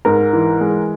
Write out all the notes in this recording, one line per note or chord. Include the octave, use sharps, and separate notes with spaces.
G#2 A#4
E3
G#3